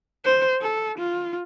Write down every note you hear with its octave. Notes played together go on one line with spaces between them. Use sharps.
C5
A4
F4